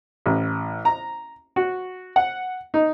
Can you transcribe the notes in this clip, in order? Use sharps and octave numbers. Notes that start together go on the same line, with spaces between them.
A1
A#5
F#4
F#5
D#4